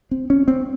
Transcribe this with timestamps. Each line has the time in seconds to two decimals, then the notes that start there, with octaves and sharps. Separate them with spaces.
0.11 C4
0.30 C#4
0.48 C4